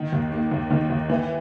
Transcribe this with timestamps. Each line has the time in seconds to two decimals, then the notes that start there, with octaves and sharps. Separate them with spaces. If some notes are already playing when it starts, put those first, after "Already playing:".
Already playing: D#3
0.12 D#2
0.32 A#3
0.51 D#2
0.71 D#3
0.90 D#2
1.10 E3